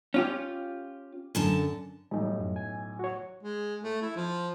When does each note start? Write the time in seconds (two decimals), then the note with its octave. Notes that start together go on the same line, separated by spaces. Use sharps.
0.14 C#4 F4 G4
1.35 F#2 D3 A5
2.11 B1 A2 G3 D#4
2.39 F#2
2.56 G#5
2.99 F#4 C#5
3.43 G#3
3.83 A3
4.02 E4
4.16 F3